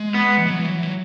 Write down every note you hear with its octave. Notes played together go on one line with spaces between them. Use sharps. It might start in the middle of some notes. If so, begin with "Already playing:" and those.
Already playing: G#3
B3
E3
F#3
E3
F#3
E3
F#3